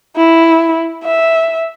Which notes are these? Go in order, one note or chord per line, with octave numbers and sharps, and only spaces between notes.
E4
E5